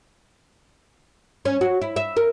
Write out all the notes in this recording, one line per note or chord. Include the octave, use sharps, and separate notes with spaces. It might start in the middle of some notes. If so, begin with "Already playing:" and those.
C#4
F#4
E4
E5
A#4